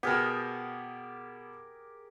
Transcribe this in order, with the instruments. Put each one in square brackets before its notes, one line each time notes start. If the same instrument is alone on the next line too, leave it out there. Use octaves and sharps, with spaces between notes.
[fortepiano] B2 B3 [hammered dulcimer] G4 G#4 A#4